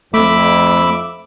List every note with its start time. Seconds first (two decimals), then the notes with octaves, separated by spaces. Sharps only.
0.14 F2 A3 E5 B5 D6